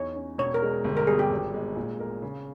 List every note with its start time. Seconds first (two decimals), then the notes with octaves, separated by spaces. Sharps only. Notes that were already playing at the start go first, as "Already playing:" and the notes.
Already playing: E2 D#4 C#5
0.15 C#4
0.38 E1 C#5
0.54 A#4
0.62 G#3
0.84 G1
0.97 A#4
1.07 G3 G#4
1.19 G4
1.30 G#1
1.54 G#3
1.76 A#2
2.00 A#4
2.22 C#3